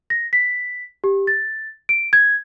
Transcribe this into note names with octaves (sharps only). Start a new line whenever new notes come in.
A#6
B6
G4
A6
D7
G#6